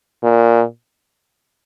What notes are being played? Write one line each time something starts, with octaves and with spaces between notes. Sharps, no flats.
A#2